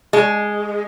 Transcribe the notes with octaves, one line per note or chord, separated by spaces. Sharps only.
G#3